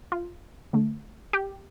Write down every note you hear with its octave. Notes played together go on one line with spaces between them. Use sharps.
F4
D3 A3
G4